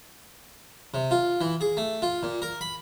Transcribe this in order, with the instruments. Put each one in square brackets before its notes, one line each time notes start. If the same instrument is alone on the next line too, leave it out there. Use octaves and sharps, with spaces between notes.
[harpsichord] C3
F4
E3
G#4
A3
F4
A#2
A#4
B5